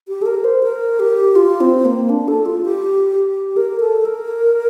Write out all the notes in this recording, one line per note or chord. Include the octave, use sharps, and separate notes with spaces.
G4
A4
A#4
C5
A#4
G4
F4
C4
A#3
D4
A4
F4
G4
A#4
A4
A#4